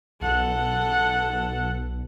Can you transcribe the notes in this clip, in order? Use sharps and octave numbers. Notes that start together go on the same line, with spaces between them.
B1 A4 F#5